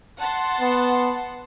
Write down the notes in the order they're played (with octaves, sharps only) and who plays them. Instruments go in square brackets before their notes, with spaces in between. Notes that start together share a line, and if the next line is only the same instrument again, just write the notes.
[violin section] F#5 A5 C6
[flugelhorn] B3